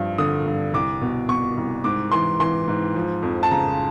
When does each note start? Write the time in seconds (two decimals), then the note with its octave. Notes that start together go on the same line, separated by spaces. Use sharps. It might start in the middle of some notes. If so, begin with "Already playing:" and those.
Already playing: G2 F3
0.18 D3 D#6
0.46 G2
0.74 C2 D6
1.01 B2
1.29 B2 C#6
1.57 C2
1.84 G#2 D6
2.11 E3 C6
2.40 E3 C6
2.68 G#2
2.96 F3
3.23 F2
3.43 A5
3.51 C#3 A#5